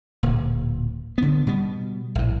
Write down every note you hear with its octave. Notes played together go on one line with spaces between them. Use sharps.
D1 A#2
D3 B3
B2 G3 B3
A#1 A2